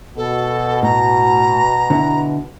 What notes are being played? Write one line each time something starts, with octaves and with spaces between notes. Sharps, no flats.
B2 A4
A2 A#5
D3 B3 E4